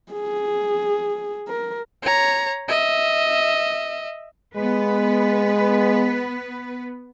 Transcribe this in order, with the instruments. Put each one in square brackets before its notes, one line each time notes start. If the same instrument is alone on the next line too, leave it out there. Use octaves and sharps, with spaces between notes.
[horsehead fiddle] G#4
A#4
[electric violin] C#5 A#5
D#5 E5
[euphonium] G#3 [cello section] B3 B4